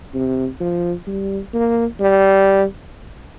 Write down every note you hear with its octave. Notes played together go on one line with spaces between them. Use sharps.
C3
F3
G3
A#3
G3